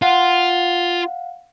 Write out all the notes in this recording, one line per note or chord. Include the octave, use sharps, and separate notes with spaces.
F4 F5 F#5